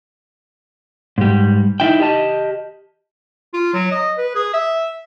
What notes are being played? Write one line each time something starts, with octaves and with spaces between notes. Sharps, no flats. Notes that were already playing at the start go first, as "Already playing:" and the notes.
G#2 G3
D#4 E4 G5
G4 D#5 A5
F4
F#3
D#5
B4
G#4
E5